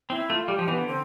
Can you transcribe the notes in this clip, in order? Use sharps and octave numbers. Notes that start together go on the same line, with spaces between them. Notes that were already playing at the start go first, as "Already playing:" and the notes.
C4 E4
A3 F4
G3 G4
F3
E3 B3
D3
C4